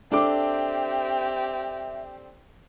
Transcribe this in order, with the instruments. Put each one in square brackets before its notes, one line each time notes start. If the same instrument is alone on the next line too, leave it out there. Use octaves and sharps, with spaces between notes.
[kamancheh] C4 G4 [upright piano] D4 A4 D6 [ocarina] E5